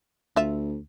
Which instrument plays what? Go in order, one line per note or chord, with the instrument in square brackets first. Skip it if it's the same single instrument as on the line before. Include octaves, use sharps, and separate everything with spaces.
[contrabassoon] D2 [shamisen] F4 E5